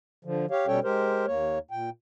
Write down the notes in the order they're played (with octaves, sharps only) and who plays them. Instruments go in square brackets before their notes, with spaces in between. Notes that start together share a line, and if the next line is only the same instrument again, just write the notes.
[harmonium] D3 F3
G4 C#5 F5
B2 G3 C#4 A4 C#5 G5
G#3 G4 A#4 C5
D#2 A#3 C#5
A#2 G5